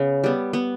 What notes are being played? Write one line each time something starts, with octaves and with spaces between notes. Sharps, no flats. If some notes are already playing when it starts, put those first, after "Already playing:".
Already playing: C#3 B3
G3 B3
B3